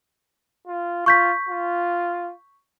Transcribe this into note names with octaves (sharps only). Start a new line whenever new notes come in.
F4
F4 C#6 G6 B6
F4